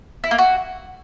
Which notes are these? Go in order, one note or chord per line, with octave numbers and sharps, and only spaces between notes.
E4
A#3
F#4